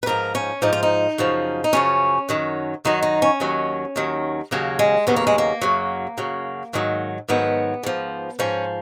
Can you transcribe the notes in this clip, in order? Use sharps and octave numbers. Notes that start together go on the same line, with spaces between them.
B4
G#2 F3 A#4
C#4
G#2 F3 D#4
F4
D#4
F#2 C#3 F3
D#4
F#2 C#3 F3 C#4
F#2 D#3 F#3
F#2 D#3 F#3 D#4
D#4
C#4
D#2 D#3 F#3
D#2 D#3 F#3
D#2 C#3 F#3 A#3
G#3
D#2 C#3 F#3 B3
A#3
G#3
A#3
F#2 C#3 F#3
F#2 C#3 F#3
G#2 D#3 F#3
G#2 D#3 F#3 B3
G#2 F3
G#2 F3 C#4